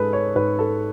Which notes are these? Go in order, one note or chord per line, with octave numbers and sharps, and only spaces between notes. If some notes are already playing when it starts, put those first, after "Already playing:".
Already playing: G#2 G#3 A4 B4
C#5
G#2 B4
A4